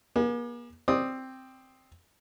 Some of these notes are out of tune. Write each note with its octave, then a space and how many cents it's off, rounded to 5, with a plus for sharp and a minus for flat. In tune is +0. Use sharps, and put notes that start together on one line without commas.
A#3 +45 G#4 +0
C4 +0 D5 +0 D#6 +0